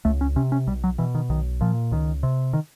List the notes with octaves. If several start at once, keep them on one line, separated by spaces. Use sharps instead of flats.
C#2 A3
C#4
C3 C#4
C#4
B1 G3
F#3
B2 E3
D#3
B1 D#3
A#2 F3
C#2 D#3
C3
D#3